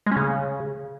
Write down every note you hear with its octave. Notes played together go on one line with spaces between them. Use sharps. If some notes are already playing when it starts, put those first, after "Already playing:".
G#3
C#4
C#3